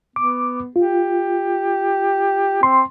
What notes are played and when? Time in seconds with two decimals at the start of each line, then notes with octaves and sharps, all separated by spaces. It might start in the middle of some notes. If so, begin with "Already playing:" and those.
0.16 B3 D6
0.76 F4 G4
2.63 C4 C6